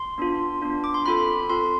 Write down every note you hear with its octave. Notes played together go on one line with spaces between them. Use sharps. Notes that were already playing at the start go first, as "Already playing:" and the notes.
Already playing: C6
B3 D4 F4
B3 D4 F4
D6
C6
C4 F4 A4 B5
C4 F4 A4 C6